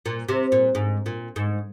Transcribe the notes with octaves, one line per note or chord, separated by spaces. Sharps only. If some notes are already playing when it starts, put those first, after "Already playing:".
A#2
C3
A#2
G#2
A#2
G#2